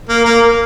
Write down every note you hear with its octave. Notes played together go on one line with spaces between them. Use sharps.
A#3
A#3